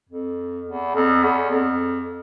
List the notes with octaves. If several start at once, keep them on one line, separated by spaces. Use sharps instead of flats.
F2
E2
F2
E2
F2